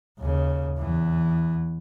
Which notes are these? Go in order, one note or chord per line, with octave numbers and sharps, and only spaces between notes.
D#2 C#3
E2 E3